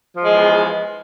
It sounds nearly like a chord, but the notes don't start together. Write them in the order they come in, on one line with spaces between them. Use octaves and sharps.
F3 G#3 E2